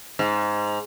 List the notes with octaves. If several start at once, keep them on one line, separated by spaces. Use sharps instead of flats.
G#2